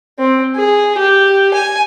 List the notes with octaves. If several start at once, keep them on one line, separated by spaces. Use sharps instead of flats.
C4
G#4
G4
G#5